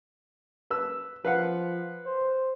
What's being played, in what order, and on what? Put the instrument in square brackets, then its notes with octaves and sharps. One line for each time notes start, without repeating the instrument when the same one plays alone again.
[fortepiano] B4 E6
[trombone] F3 [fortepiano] B4 F5 F#5
[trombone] C5